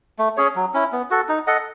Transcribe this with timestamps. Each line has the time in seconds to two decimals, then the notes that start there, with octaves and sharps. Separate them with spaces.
0.19 A3
0.37 C#4 G#4 C#5
0.56 F#3
0.74 C#4 E4
0.92 B3
1.11 F#4 A4
1.29 D#4
1.47 A4 D#5 F#5